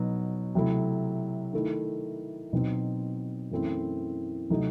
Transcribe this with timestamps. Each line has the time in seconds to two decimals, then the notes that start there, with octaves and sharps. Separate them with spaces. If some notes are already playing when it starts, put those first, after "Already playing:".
Already playing: B2 F#3 B3 D#4
0.55 C3 F#3 A3 E4
1.53 D#3 A3 E4
2.53 B2 F#3 C4 D#4
3.51 F#2 E3 A3 C4 E4
4.50 C3 F#3 A3 D#4